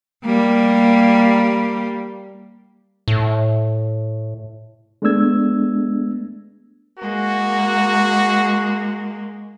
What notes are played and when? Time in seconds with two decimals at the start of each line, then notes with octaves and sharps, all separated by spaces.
0.25 G3 A#3
3.08 A2
5.02 G#3 A3 B3 D4 E6 G#6
6.99 G#3 A#3 F#4